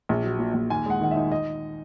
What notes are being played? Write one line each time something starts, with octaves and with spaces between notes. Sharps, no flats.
A#1
F#3
A#2
A#1
D#2 G#5
G#3 F#5
D#3 F#5
D#4 E5
D#5